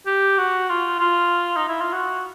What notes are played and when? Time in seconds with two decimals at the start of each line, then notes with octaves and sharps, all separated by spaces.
0.06 G4
0.38 F#4
0.69 F4
0.99 F4
1.56 D#4
1.68 E4
1.81 F4
1.92 F#4